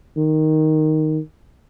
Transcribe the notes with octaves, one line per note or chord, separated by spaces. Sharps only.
D#3